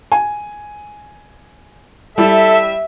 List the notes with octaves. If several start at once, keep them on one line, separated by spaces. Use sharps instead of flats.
G#5
G3 E4 A4 E5